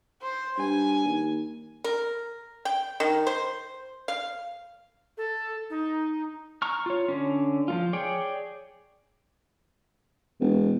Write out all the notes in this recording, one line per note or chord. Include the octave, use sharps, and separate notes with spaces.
C5
G2 G#5
D#2
A#4
G5
D#3
C5
F5
A4
D#4
A#5 C#6 F6
F4 C#5
D3 C#4
F3 A3 F4
G#4 C#5 D5 G5
E1